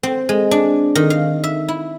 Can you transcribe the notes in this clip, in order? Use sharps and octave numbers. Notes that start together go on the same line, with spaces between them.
C4
G#3
D4
D#3
F5
E5
E4